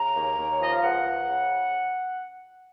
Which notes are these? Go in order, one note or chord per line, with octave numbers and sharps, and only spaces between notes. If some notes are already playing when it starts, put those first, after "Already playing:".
Already playing: C#3 A#5
D#2
D#2
C#5
F3 D#5
F5
C#2 F#5
F3
C#3